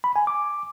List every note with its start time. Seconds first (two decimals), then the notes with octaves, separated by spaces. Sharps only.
0.04 B5
0.16 G#5
0.27 D6